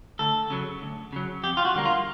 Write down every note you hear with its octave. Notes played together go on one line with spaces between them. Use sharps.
D2 A4
C#3 F#3
D2
C#3 F#3
F2 G4
F4
F#4
D3 G3 A#3
F4